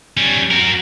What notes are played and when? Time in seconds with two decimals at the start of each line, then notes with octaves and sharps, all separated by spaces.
0.17 G3 C#4
0.51 F#4 A#4